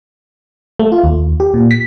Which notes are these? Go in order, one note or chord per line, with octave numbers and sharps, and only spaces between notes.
A3
F4
D#2
G4
A#2
B6